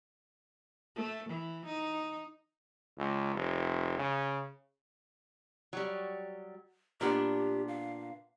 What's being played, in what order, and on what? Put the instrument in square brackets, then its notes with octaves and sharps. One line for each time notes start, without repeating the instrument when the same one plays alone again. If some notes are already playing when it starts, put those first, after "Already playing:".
[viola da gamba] A3
E3
D#4
[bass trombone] C#2
F1
C#3
[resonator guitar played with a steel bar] F#3 G3
[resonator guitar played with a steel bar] A#2 B3 D4 [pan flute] G4
[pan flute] F5